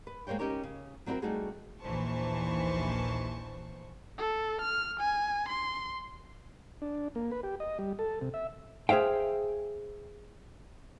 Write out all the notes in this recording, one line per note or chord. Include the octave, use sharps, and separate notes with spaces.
B4
G#3 A#3 C5 C#5 G5
C#4 D#4 G4 A#4 C#5
C#3
F#3 C4 C#4 E4 F#4 A#4
G3 A3 B3 D#4 F#4 G#4
A#1 D#2 E3 C5 A5 C#6
A4
F6
G#5
C6
D4
A#3
B4
G4
D#5
G3
A4
C3
E5
G#4 C5 E5 F5 G5